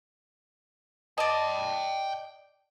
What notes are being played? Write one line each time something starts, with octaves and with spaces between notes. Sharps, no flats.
D5 D#5 G5 A5